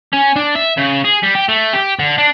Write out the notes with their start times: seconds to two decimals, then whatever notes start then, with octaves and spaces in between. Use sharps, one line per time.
0.13 C#4
0.36 D4
0.55 E5
0.77 C#3
1.04 G#4
1.23 G3
1.35 G4
1.49 A3
1.73 G4
1.99 D3
2.18 D4